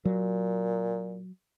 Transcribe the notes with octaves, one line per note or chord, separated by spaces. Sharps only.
A#2 F#3